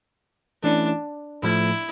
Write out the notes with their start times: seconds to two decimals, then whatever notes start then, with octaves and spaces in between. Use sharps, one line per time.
0.63 E3 A3 C#4 D4 E4
1.43 A2 F3 A3 E4